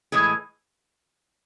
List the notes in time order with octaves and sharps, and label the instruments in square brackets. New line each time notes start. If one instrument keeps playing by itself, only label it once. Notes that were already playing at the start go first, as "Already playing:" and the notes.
[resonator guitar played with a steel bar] A2 E3 G#3 G#4